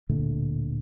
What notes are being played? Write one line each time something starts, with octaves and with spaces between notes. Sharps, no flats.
D1 A#2 D3 A3